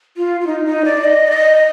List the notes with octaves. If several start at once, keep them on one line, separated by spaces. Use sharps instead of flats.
F4
F4
D#4
D#4
D5
D#5
D5
D#5